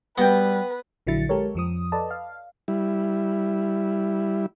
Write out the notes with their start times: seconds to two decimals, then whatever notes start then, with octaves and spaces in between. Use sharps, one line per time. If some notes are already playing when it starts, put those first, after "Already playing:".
0.18 G3 B3 F#4 B4 F#5 G5
1.07 A#1 D3 F#3 E4 A6 C#7
1.29 G#3 G4 A4 A#4 C#5
1.55 F2 F3 D#6
1.92 A4 B4 D5 D#5 A5
2.11 F5
2.68 G3 E4